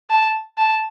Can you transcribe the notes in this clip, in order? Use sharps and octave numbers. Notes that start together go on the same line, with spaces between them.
A5
A5